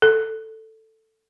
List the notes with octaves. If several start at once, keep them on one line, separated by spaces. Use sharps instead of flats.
A4